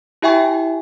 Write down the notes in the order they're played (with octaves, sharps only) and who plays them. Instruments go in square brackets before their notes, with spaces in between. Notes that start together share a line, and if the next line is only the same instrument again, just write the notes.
[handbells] E4 G4 E5 G5 G#5 C#6